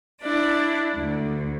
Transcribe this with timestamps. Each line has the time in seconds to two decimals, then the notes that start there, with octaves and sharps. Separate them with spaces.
0.21 D4 E4 D5
0.96 D2